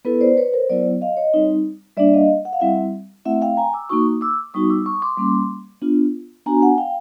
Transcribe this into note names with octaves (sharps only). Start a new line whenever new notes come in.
B3 E4 A4 B4
C5 D5
B4 C#5
A#4 C5
F#3 B3 E4 C5 D5
D#5 F5
C#5 D#5
G3 C4 D#4
G3 A#3 D4 D5 E5
D#5 F5
F#5
F5
G3 C4 E4 E5 F#5
A3 C4 E4 E5 F#5
F5 G5
G#5 A#5
D6 E6
A#3 D#4 F#4 C#6 D#6
D6 E6
G3 B3 D#4 F#4 C#6 D#6
D6 E6
C#6 D#6
C6 D6
G3 A#3 C#4
B3 D4 F4
B3 D4 F#4 G#5 A#5
F#5 G#5
F5 G5